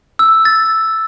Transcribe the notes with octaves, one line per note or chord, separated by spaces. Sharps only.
E6
A6